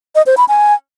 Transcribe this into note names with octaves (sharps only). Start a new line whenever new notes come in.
D#5
C5
B5
G#5